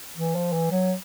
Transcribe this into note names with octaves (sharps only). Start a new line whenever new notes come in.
E3
F3
E3
F#3